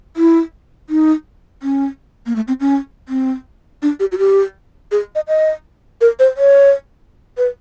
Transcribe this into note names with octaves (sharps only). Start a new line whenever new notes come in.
E4
D#4
C#4
A#3
A3
C4
C#4
C4
D4
G4
F#4
G4
G#4
D#5
D#5
A#4
C5
C#5
B4